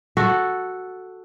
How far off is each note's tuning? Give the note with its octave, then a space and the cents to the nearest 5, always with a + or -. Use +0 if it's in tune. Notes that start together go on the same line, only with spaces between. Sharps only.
F#4 +0 A4 +0